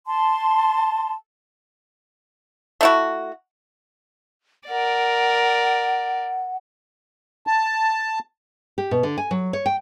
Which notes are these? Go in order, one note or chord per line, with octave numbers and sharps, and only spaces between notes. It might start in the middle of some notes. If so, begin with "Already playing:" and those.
A5 C6
A3 E4 F#4
A#4 D5 F#5
A5
G4
B2
D3
G#5
F#3
C#5
G5